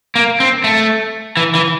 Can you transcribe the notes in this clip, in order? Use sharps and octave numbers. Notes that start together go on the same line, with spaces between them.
A#3
C4
A3
E3
E3